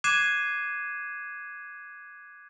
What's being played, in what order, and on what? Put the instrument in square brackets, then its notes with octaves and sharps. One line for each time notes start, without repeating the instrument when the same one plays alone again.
[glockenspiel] D6 F#6 G#6 C7 D#7 E7